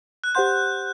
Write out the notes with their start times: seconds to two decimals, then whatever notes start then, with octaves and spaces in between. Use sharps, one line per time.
0.24 F#6
0.35 G4 C5 F#5 C6 G6